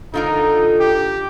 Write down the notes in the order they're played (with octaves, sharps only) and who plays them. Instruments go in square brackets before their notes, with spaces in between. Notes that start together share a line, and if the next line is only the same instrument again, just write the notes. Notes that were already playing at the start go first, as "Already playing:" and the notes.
[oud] D3 F4 A#4 [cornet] D#4
[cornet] G4